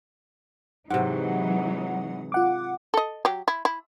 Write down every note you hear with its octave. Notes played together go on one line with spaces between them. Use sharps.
G#2 C3 E3 F#3 D#4 F#5
F4 F#5 D6
A4 D#5
F#3 G4
E4
E4